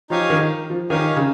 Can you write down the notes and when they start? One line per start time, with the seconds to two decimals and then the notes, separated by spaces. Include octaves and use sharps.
0.10 F3 D#4 G4 C#5 F5 G#5
0.30 D#3
0.70 F3
0.90 D#3 D#4 G4 C#5 F5 G#5
1.16 C#3